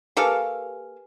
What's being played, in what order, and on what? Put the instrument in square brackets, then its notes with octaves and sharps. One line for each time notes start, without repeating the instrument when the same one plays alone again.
[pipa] A#3 A4 F5 [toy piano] G4 B4 G#5